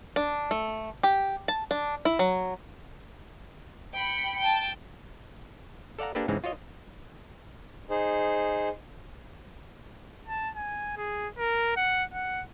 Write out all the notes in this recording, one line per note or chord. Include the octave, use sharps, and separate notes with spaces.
D4
A3
G4
A5
D4
E4
F#3
G5 B5 C#7
G5 A5
A4 D5 F5 F#5 A#5
A#3 D4 G4 A4 B4
G#2 C#3 E3 G#3 C4
F4 F#4 C#5 D#5
D#4 G#4 C5
A5
G#5
G#4
A#4
F#5
F#5